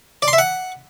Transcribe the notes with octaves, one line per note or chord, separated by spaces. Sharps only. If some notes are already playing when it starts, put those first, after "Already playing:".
D5
C6
E5
F#5